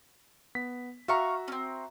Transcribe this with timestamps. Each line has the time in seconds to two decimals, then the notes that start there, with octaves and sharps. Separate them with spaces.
0.55 B3 B6
1.08 F#4 E5 F5 A#5 C#6
1.48 C4 C#4